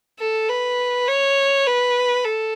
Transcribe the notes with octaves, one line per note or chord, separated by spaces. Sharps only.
A4
B4
C#5
B4
A4